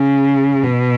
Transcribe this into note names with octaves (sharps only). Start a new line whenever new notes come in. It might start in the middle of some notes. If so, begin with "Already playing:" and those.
Already playing: C#3
B2